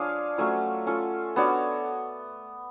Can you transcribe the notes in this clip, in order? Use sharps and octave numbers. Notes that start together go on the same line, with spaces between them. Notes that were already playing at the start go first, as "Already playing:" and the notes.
Already playing: F3 D4 F4 G#4 C#5 F5
F#3 A3 C#4 F4
C#4 F4 A4
B3 D4 F#4 C#5